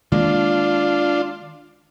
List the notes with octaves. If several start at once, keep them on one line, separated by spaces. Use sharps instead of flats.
D#3 G#3 A#3 D4 F4